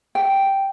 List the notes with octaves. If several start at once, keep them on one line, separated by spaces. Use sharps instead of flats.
G5